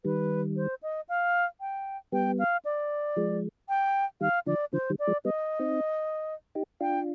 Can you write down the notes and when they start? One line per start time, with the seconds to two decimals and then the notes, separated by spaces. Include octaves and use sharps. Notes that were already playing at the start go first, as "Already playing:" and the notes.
0.04 D#3 G3 B4
0.56 C5
0.83 D#5
1.09 F5
1.61 G5
2.12 G3 B3 G5
2.39 F5
2.65 D5
3.16 F3 G#3
3.69 G5
4.21 D#3 G3 F5
4.47 D3 F3 D5
4.73 D3 F3 C5
4.90 D#3 G3
4.99 D5
5.07 F3 G#3
5.25 G3 B3 D#5
5.59 C4 D#4
6.55 D#4 G4
6.81 D4 F4 G5